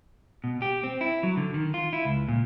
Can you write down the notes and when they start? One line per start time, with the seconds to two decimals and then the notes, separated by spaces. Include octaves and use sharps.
0.44 B2
0.62 G4
0.84 C4
1.01 E4
1.23 F#3
1.37 D3
1.54 D#3
1.74 F4
1.93 E4
2.05 C#2
2.28 A#2